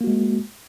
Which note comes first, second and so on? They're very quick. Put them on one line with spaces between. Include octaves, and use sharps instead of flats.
A#3 F#4 G#3